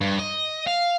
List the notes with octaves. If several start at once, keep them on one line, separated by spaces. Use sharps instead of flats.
G2
D#5
F5